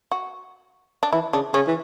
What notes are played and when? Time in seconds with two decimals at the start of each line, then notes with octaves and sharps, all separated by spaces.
0.11 F#4
1.03 D4
1.13 E3 E4
1.33 C#3 D4
1.54 C#3 C#4
1.67 E3